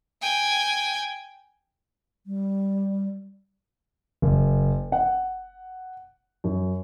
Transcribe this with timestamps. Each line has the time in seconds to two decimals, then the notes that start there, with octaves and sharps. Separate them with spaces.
0.21 G5 G#5
2.26 G3
4.22 F#1
4.92 F#5
6.44 F#2